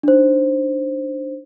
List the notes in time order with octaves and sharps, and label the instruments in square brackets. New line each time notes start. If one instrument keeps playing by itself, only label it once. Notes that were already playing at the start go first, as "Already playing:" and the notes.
[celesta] D4 D#4 C5